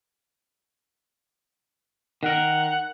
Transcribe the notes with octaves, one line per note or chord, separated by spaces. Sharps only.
D#3 A#4 F#5